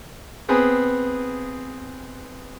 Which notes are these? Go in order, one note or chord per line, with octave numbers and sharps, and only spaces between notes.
B3 C4 G#4 B4